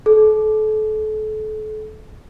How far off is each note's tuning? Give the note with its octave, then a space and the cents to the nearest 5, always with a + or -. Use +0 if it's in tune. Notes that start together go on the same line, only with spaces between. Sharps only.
A4 -30